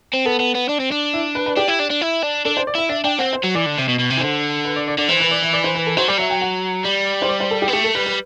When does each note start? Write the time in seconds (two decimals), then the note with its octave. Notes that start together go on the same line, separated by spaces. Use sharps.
0.14 C4
0.25 B3 A4
0.40 B3
0.55 B3
0.69 D4
0.80 C4
0.92 D4
1.14 E4
1.35 B4
1.46 B4
1.57 D4 G4
1.68 E4
1.80 D4
1.91 D4
2.02 E4
2.23 D4
2.45 D4 A4
2.57 C5
2.67 D5
2.75 E4 E5
2.89 D4 E5
3.04 D4 G5
3.18 C4 F#5
3.33 C5
3.44 F#3
3.55 E3 D5
3.66 D3
3.78 C3
3.88 B2
3.99 B2
4.10 C3
4.17 E3
4.21 D3 C5
4.65 B4
4.76 D5
4.88 D5
4.98 D3 D5
5.09 E3 C5
5.20 B4
5.31 D5
5.42 E5
5.53 D5
5.64 C5
5.75 B4
5.86 A4
5.97 F#3 C5
6.08 G3 D5
6.17 F#3 E5
6.30 G5
6.41 F#5
6.85 G3
7.22 C5
7.29 D5
7.40 C5
7.51 A4
7.62 G4
7.68 B3
7.73 A3 G4
7.84 A4
7.95 G3 B4
8.06 B4